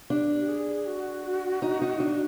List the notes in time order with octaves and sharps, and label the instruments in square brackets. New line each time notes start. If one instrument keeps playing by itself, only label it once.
[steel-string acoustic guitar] D4 [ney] G4
[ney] G4
G#4
F#4
[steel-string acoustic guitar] D#4
D#4
D4